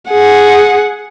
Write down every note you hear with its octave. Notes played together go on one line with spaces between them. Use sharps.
G#4 F#5